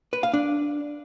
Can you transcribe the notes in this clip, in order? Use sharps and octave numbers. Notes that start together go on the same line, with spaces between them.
B4
F5
D4